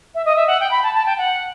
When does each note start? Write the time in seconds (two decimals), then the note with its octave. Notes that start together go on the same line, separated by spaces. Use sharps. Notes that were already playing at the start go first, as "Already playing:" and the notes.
0.15 E5
0.25 D#5
0.36 E5
0.47 F#5
0.60 G5
0.71 B5
0.83 A5
0.95 A5
1.06 G5
1.18 F#5